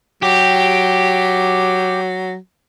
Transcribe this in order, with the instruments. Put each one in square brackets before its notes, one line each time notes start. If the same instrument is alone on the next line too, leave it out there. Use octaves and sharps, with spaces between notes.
[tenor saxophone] F#3 [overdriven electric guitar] G4